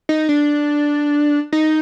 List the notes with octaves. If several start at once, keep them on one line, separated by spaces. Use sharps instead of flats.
D#4
D4
D#4